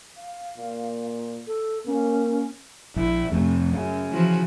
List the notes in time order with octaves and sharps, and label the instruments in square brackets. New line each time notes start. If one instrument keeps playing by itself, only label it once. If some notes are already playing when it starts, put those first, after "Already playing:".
[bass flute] F5
[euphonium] A#2
[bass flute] A4
[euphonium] A#3 [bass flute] C#4
[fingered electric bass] A#1 [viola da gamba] E4
[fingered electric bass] F2 C3 [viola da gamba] A3
[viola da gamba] F#2 [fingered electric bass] C#3
[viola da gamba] E3 F3 F#4